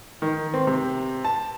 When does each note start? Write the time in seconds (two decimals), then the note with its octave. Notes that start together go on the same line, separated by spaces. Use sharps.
0.22 D#3
0.54 C4
0.67 C3
1.25 A5